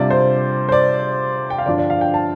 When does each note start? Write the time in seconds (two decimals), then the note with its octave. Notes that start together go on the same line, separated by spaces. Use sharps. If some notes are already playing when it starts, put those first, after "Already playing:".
Already playing: C3 G3 D4 F4 D5
0.10 C5
0.69 C5
0.72 D5
1.50 G5
1.58 F5
1.66 G2 D3 F3 D4 F4 D5
1.78 D5
1.90 F5
2.01 G5
2.14 A5